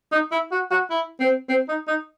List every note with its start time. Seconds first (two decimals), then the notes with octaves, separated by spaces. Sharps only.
0.12 D#4
0.32 E4
0.52 F#4
0.71 F#4
0.90 E4
1.20 C4
1.49 C4
1.68 D#4
1.88 D#4